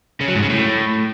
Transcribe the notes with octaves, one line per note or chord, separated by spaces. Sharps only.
C#3
F#3
G#2
C#3
A2